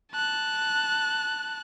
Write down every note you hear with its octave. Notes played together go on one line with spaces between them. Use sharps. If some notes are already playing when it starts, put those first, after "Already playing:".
A5 F#6